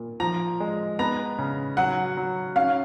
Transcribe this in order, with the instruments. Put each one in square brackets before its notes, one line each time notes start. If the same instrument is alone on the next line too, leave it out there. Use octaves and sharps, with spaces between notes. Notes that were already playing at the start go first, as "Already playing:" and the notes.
Already playing: [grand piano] A#2
[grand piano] F3 [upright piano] A#5
[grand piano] G#3
[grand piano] B3 [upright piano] A#5
[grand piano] C#3
[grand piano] F#3 [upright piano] F#5
[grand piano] F#3
[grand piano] C#4 [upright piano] F5